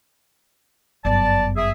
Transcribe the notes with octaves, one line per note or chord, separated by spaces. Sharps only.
G1 F#2 D5 A5
G#4 E5